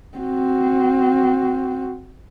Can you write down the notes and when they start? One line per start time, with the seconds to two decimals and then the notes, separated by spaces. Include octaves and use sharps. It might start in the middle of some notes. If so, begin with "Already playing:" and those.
0.17 C4 F#4